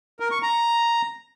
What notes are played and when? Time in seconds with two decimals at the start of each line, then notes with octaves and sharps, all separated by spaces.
0.20 A#4
0.31 C#6
0.42 A#5